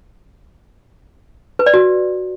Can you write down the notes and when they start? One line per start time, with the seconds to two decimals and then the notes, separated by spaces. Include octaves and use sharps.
1.59 B4
1.66 D5
1.74 F#4